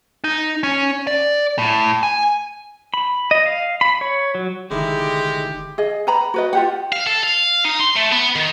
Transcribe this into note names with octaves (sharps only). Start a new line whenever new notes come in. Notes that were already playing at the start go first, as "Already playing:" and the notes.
D#4
C#4
D5
A2
G#5
B5
D#5
F5
B5
C#5
F#3
F1 D3 D#3 G#3 E4 G4
G#4 D#5
B4 A#5 B5
F#4 B4 D#5
F4 G4 F#5
F5
A4
F5
D#4
C6
A3
B3
D#3